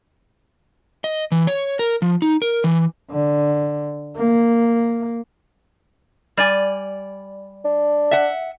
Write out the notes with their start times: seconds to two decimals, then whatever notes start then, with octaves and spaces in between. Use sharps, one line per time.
1.04 D#5
1.32 E3
1.47 C#5
1.79 A#4
2.02 F3
2.22 D#4
2.42 A#4
2.64 E3
3.11 D3
4.16 A#3
6.37 G3 D5 G#5
7.65 D4
8.11 E5 F#5